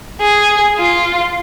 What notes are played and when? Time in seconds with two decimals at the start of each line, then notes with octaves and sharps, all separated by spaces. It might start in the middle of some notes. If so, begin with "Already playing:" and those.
0.21 G#4
0.78 F4